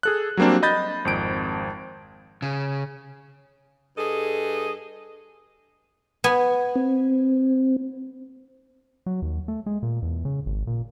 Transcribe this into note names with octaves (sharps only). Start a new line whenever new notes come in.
G#4 A4 F#6
F#3 G3 A#3 C4 D4
D#5 B5 G6 A6
G#1 F2 D7
C#3
G2 G#4 A4 D#5
B3 G#5
C4
F#3
D#2
A3
G#3
A#2
E2
C#3
G#1
A#2